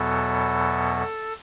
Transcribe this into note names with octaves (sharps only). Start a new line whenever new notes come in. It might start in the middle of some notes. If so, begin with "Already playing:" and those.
Already playing: E2 B2 F#3 B3 A4
A4